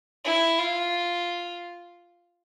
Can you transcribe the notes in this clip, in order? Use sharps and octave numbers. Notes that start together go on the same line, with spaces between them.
E4
F4